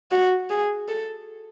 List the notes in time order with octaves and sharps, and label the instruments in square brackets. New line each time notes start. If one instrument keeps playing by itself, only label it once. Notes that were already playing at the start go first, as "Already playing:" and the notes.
[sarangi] F#4
G#4
A4